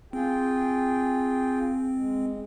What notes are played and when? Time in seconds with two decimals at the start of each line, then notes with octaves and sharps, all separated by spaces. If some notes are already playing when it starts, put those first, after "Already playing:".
0.13 C4 F4 G#4 G5
1.96 G#3